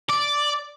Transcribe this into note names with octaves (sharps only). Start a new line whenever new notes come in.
D5